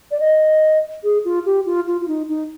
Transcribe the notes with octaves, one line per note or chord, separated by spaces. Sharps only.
D5
D#5
G#4
F4
G4
F4
F4
F4
D#4
D#4